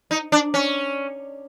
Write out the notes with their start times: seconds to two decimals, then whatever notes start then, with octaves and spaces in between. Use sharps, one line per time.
0.11 D#4
0.32 D4
0.54 C#4